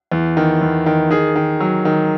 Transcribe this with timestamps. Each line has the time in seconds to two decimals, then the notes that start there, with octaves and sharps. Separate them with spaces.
0.12 E2
0.37 D#3
0.61 E2
0.86 D#3
1.11 D#3 G#4
1.36 D#3
1.60 F#3
1.85 D#3